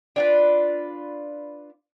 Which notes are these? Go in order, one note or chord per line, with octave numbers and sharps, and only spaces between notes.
D4 F4 B4